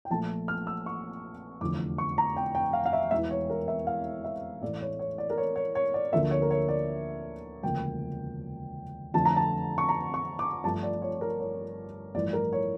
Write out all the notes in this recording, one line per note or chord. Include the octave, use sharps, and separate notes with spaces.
G5
A#1 A#2 F3 A3 A5
F6
E6
C#6
F1 E2 D3 F3 D6
C#6
A#5
G5
G5
F5
F5
E5
E1 E2 E3 E5
C#5
A#4
E5
F5
E5
A1 A2 E3 A3 D5
C#5
C#5
D5
A#4
C#5
C#5
C#5
D5
D2 D3 F3 A#3 E5
C#5
A#4
C#5
D5
E1 D2 C#3 F3 A#3 G5
F2 D3 F3 A3 A5
A#5
A5
C#6
A#5
C#6
D6
G1 G2 F3 A3 A5
D5
C#5
A#4
C#5
A1 G2 F3 A3 D5
A#4
C#5